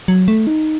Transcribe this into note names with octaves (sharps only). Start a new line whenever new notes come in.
F#3
A3
D#4